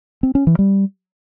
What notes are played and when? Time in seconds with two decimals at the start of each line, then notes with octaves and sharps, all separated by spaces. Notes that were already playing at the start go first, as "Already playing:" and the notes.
0.23 C4
0.35 C#4
0.47 E3
0.59 G3